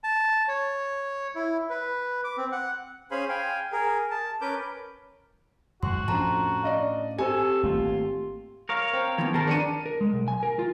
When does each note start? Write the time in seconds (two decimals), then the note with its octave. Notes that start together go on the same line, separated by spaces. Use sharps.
0.04 A5
0.48 C#5
1.35 E4
1.70 B4
2.24 D6
2.38 C4
2.52 F#5
3.11 C#4 G#4 C5 F5 G#5 B5
3.29 F5 G5 G#5
3.72 G#4 A#4
4.11 A5
4.41 C#4 A#4 B4 D6 G6
5.83 F2 G#2 F#4 C6
6.08 F2 A2 C#4 D4 A5 A#5
6.63 D5 D#5 F5
7.19 C4 G4 A4 C5 G#5
7.63 G#1 A3 A#3 F4
8.69 A#4 C#5 F5
8.93 C4
9.18 E3 F3 B3
9.34 D#3 G#4 A#4 A5
9.47 D4 C#7 D#7
9.86 A#4
10.01 G#3
10.12 B1
10.28 G#5
10.43 A#4
10.59 F4